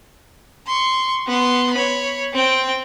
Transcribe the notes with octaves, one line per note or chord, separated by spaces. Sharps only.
C6 C#6
B3 C6
C#5 B5
C4 G5